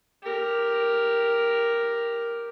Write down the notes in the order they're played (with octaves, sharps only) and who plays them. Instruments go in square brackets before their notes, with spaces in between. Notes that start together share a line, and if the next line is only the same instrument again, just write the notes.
[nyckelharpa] G4 A#4